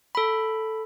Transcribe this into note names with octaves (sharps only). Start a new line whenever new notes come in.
A4 B5